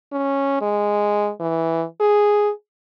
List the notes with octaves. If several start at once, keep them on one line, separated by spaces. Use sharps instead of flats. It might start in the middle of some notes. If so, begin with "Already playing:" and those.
C#4
G#3
E3
G#4